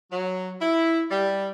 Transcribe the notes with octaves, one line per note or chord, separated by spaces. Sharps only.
F#3
E4
G3